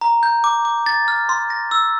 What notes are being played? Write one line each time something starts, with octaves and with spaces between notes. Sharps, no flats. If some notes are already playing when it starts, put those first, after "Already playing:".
A#5
G6
D6
D6
A6
F6
C6
A#6
E6